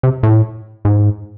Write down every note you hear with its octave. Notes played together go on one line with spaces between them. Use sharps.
C3
A2
G#2